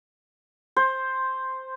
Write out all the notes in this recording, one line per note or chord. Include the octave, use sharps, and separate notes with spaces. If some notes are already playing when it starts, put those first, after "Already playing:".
C5